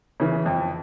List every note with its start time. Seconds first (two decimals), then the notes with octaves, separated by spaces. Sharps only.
0.20 C#3 E3
0.46 F2